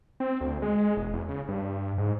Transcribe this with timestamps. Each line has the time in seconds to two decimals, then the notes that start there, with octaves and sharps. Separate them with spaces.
0.20 C4
0.41 D2
0.62 G#3
0.97 E1
1.14 E2
1.29 C#3
1.48 G2
1.62 G2
1.98 G#2